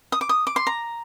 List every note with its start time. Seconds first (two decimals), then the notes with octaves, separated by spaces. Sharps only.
0.12 D#6
0.21 D6
0.29 D#6
0.47 D6
0.56 C6
0.67 A#5